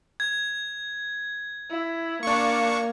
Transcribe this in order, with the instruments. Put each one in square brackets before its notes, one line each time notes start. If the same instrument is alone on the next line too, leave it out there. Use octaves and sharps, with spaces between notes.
[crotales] G#6
[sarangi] E4
[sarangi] A#3 [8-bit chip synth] D4 C#6